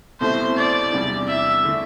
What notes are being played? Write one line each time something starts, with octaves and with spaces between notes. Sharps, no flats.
C2 B2 A3 C4 E4 C5
D5
E2 C3 G3 D4
E5
D3 A3 E4